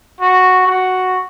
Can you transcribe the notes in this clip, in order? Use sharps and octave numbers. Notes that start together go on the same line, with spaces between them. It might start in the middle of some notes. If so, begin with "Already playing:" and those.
F#4
F#4